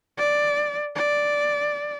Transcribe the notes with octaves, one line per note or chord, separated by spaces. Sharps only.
D5
D5